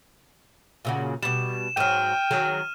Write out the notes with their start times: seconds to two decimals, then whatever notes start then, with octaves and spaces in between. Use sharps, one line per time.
0.85 A#2 C#3 F#4
1.23 B2 G3 E7
1.77 G#2 F#3 G5 F6 D#7
2.31 D#3 F#3 G#4